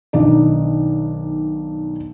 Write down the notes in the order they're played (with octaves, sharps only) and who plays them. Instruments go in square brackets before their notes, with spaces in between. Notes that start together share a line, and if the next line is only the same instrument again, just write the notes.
[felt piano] B1 D#3 D4 D#4 D5